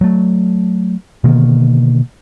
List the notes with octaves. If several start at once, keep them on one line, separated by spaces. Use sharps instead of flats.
F#3 A3
B2 D3 D#3 A#3